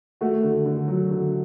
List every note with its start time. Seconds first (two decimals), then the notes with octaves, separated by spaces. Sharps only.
0.21 A3 F#4
0.44 D3
0.66 D3
0.88 F#3
1.10 D3